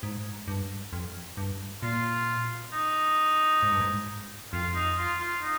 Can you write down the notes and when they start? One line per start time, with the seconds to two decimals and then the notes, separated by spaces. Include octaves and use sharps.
0.03 G#2
0.48 G2
0.93 F2
1.37 G2
1.82 A#2 F4
2.72 D#4
3.63 G#2
3.72 G2
3.81 G#2
4.53 F2 F4
4.75 D#4
4.98 F4
5.20 F4
5.42 D#4